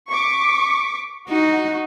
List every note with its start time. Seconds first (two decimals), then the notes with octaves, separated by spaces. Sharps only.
0.10 C#6 D6 B6
1.29 D#4 F#4